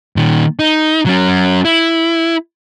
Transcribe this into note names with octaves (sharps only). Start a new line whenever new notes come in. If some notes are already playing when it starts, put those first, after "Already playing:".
A#2 D#3
D#4
F#3 C#4
E4